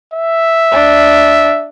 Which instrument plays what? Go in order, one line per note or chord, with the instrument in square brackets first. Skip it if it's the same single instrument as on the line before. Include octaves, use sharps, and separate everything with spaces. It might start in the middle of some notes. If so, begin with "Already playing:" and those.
[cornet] E5
[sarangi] D4